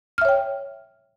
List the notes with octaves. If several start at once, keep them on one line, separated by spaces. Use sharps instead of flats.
C#5 E5 G5 F6